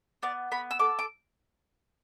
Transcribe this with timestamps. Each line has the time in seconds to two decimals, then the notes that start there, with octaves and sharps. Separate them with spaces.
0.22 B3 D5
0.51 B3 B5
0.71 E6
0.79 A4 D6
0.99 D6